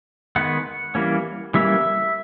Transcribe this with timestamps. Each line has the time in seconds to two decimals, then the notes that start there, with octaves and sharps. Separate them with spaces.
0.36 D#3 G#3 B3 F#5
0.95 E3 G3 A#3 C#4
1.54 E3 G3 A#3 C#4 E5